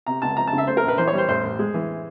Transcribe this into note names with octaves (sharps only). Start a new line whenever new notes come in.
C3 A#5
C#2 A5
F2 A#5
A5
C#3
E5
A3 C5
A#4
A#1
B4
E3 C5
C#5
G3 C5
A1 C5
A1
G#3
E3